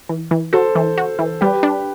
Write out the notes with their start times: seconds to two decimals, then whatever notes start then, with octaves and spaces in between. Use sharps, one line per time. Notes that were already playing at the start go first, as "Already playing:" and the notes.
0.09 E3
0.31 E3
0.53 F#4 A4 C5
0.75 E3
0.98 F#4
1.19 E3
1.41 G3 G4 B4
1.63 D4